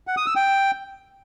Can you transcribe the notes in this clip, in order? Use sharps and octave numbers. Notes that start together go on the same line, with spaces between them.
F#5
D#6
E6
G5